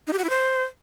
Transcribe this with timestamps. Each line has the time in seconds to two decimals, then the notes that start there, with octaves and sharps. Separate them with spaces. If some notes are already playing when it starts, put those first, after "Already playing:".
0.07 D#4
0.13 G4
0.18 F#4
0.24 E4
0.30 C5